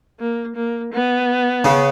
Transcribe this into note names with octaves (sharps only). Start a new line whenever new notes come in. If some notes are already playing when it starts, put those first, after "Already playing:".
A#3
A#3
B3
C#3